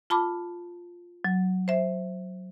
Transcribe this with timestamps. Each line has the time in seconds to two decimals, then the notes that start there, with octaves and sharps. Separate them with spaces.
0.10 F4 A5 B5 D6
1.24 F#3
1.68 C5 E5